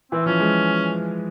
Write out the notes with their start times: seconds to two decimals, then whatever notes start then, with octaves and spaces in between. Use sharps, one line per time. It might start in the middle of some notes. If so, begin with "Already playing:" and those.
0.12 E3 C4
0.26 F3 C#4
0.40 G#3